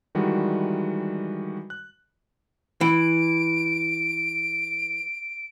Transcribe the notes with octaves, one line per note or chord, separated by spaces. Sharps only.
D#3 E3 G3 G#3 F#4
F#6
E3 D7